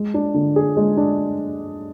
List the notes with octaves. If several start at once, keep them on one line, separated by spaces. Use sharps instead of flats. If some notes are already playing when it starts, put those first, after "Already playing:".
Already playing: G#3
D4
D3
G#4
G#3
D4